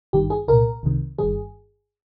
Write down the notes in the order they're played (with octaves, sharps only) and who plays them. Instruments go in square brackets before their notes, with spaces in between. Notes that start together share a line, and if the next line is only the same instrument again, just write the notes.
[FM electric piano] G#1 G2 D#3 G4
G#4
C2 A#2 A#4
C2 C3 D#3
G1 G2 D#3 G#4